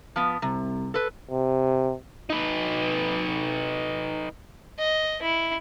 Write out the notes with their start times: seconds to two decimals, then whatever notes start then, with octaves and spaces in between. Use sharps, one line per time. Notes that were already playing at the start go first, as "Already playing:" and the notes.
0.16 F3 B3
0.42 C2 C3
0.94 A4 B4
1.30 C3
2.30 D#4 B4
4.79 D#5
5.22 E4